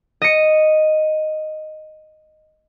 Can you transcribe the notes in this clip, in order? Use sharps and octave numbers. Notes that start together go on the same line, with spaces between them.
D#5 C#7